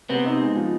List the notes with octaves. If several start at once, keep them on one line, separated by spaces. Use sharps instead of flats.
C3 B3 C4
D#4
G#3
F3